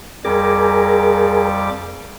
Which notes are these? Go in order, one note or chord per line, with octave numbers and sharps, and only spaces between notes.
F2 G3 G#4 A#4 D6